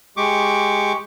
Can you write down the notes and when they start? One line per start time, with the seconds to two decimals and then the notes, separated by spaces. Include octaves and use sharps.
0.17 G#3 G4 C#6 D6